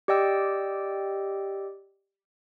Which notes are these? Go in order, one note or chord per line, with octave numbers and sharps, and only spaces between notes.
G4 D5 D#5 G5 E6